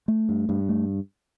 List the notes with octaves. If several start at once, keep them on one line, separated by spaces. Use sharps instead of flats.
A3
G2
G2
A3